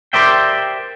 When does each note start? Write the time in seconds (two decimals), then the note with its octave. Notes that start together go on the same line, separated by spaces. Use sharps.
0.13 G4 A#4 C5 D5 E5 G5